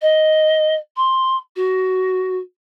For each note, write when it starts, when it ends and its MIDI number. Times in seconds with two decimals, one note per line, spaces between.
0.01 0.75 75
0.96 1.35 84
1.56 2.37 66